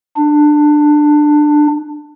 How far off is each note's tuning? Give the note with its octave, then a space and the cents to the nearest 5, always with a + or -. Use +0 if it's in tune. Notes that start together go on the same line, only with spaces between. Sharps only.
D4 +20